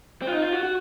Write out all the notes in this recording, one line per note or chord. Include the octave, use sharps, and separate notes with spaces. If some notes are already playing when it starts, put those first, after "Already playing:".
C4
F4
D#4
F4
F#4
F#4